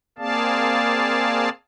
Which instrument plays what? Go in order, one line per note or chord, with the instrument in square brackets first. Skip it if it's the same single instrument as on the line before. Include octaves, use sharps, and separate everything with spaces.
[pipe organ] A#3 C4 G#4 D5 F5 A5